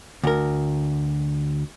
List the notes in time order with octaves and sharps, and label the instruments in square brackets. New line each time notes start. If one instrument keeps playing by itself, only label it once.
[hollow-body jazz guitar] D2 A#4